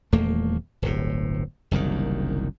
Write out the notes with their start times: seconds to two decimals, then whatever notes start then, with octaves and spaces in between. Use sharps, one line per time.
0.12 D#1 E2 A3 A#3
0.82 D1 G1 A2
1.71 F#1 C2 F#2 D#3